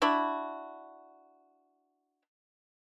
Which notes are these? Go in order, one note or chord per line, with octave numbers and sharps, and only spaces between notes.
D4 E4 F#4